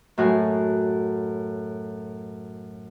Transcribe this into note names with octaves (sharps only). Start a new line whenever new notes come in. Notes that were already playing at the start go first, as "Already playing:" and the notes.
F#2 A2 F#4 G#5